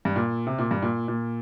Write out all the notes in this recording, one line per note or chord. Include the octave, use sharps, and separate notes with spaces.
G2
A#2
C3
A#2
G2
A#2
A#2